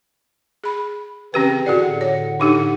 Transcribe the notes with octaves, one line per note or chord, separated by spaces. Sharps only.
G#4 B5
C#3 E3 C4 C#4 G4 B4
A2 D3 F#4 G#4 D5 F#5
C#5
D4 D#4 G4